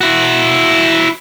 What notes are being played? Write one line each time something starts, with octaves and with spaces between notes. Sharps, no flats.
E4 F#4